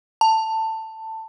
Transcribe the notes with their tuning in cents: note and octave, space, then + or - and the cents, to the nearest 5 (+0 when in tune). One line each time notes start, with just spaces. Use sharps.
A5 +15